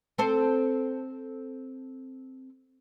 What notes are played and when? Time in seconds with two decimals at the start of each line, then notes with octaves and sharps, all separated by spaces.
0.18 C4 A4 C5